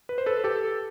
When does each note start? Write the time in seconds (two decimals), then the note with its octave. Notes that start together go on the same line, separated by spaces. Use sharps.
0.09 B4
0.18 C5
0.26 A4 B4
0.44 G4 A4